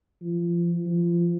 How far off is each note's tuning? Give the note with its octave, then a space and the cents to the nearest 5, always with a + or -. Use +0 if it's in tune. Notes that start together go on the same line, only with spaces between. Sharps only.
F3 -30
F3 -25